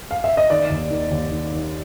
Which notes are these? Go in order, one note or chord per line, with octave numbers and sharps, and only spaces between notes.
F5
E5
D#5
D#3 D5
D#2
D#3
D#2
D#3
D#3